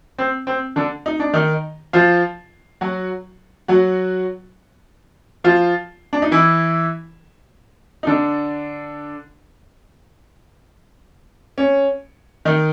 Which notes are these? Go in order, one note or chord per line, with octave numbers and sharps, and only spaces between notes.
C4
C4
D3 D4
D#4
D4
D#3 D#4
F3 F4
F#3 F#4
F#3 F#4
F3 F4
D4
D#4
E3 E4
D#4
D3 D4
C#4
D#3 D#4